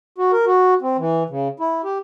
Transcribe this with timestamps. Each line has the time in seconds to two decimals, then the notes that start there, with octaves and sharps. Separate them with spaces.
0.18 F#4
0.33 A#4
0.46 F#4
0.82 C4
0.98 E3
1.30 C#3
1.60 E4
1.84 G4